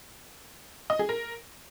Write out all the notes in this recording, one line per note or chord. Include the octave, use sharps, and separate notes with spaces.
D#5
G#4
A#4